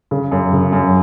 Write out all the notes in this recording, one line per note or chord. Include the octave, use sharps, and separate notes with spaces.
C#3
F#2
C#3
F#2